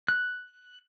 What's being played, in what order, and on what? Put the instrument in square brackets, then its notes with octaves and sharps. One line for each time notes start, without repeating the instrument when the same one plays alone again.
[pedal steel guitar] F#6